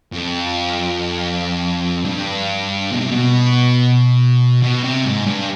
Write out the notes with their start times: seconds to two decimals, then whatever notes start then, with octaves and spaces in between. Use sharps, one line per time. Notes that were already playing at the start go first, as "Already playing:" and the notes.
0.13 F2
2.05 G2
2.91 B2
3.01 C3
3.11 B2
4.63 B2
4.84 C3
5.06 G#2
5.27 G2